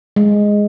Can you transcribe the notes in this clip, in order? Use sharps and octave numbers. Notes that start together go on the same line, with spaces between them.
G#3